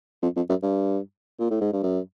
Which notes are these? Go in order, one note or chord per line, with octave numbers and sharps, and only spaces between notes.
F2
F2
F#2
G2
A#2
A2
G#2
G2
F#2